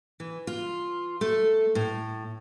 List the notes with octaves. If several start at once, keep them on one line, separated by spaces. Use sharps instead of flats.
E3
F4
A3
A2